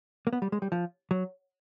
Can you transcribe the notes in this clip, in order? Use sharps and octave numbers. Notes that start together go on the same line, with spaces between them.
A#3
B3
G3
G#3
G3
F3
F#3